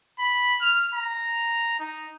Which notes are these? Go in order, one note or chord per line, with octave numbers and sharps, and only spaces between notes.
B5
F6
A#5
D#4